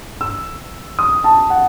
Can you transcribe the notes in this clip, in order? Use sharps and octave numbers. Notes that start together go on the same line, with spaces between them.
E6
D#6
A5
F#5